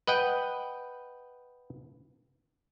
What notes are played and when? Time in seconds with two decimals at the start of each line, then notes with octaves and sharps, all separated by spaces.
0.07 B4 D#5 F#5 G5